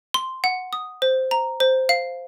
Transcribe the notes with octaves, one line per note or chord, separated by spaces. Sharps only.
C6
F#5
D#6
C5
A#5
C5
F5